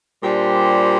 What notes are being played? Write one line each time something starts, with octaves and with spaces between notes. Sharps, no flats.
A#2 G3 D4 G4 C5